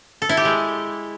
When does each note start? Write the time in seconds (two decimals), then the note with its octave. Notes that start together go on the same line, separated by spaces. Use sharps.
0.22 A4
0.29 E4
0.37 G4
0.45 G#3